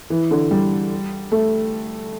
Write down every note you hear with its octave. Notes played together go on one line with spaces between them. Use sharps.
E3
D3
G3
A3